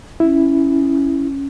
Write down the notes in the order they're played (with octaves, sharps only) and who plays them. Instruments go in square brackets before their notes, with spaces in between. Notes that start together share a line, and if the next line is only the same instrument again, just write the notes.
[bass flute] C#4 [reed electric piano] E4